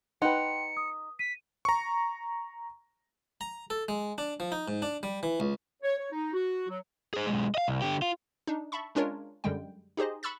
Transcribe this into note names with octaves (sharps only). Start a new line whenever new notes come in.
D#4 B4 F#5 G5 C6 C#7
D#6
B6 D#7
A#5 C#6
A#5
A4
G#3
D4
F3
D#4
G#2
D4
G3
E3
C#2
C#5
C#5
D#4
F#4
F#3
G#4 C5
B1 G#3
D#5 F5
C2
D3 G4
F4
D4 D#4
E5 A5 B5 C#6
G#3 C#4 D4 F4 A#4 C#5
F#2 D3 G3 G#3 G5
D#4 G4 G#4 C5 D#5
B5 C#6 E6 F#6 A6